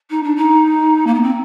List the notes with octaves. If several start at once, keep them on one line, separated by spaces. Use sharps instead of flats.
D#4
D4
D#4
A#3
B3
C4